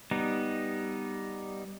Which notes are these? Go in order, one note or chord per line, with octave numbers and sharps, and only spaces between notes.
G3 B3 D#4